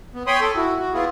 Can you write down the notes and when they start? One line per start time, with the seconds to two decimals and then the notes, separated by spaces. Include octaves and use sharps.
0.14 B3
0.27 C#5 G5 B5 C6 D#6
0.41 A4
0.56 E4 F#4
0.77 F#4
0.93 B3 E4 F4 G#4